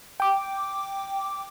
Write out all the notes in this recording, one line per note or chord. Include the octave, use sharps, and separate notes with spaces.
G5 D6